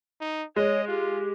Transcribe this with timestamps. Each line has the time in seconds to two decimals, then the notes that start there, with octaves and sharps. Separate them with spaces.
0.21 D#4
0.56 G#3 C#5 D#5
0.88 F4 G4